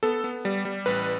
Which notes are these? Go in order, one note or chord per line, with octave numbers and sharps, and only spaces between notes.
B3 A4
B3
G3
G3
A1 B4